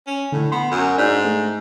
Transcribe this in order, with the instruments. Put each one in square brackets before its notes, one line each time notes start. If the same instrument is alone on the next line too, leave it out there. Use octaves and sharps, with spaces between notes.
[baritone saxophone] C#4
[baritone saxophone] A2 [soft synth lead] D3
[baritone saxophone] B3 [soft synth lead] C6
[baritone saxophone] F#2
[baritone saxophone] G#2 [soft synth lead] D4
[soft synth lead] A3